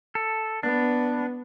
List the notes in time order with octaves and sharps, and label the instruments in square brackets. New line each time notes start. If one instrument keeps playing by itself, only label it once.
[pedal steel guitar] A4
[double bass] B3 [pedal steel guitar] D4